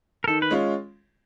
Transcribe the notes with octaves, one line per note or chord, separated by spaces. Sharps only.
A#4
D#3 A4
B4
G#3 C#4 F4